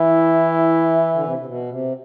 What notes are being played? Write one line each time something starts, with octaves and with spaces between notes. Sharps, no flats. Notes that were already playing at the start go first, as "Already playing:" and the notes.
Already playing: E3 E4
D3
C3
C3
B2
C3